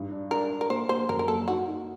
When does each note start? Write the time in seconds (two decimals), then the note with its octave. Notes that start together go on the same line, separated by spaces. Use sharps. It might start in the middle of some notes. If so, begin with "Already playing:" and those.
Already playing: G2 D#4
0.11 D4
0.31 D4 A#4
0.50 D4
0.61 A#4
0.70 A#3 C5
0.89 A#3 C5
1.09 F#2 A#4
1.19 A#4
1.28 A#3 A4
1.48 D#4 F#4
1.67 D#4